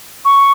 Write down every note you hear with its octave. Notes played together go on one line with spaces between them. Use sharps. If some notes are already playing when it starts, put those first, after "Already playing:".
C#6